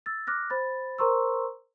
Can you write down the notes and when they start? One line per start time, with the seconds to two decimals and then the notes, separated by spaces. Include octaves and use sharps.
0.06 E6 A6
0.27 D6 F6 F#6 A#6
0.50 C5 B5 A6
0.98 A#4 C5 A#5 C6 C#6 E6